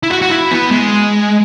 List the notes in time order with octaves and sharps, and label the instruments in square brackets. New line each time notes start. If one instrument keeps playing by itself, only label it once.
[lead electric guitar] E4
F#4
F#4
E4
B3
G#3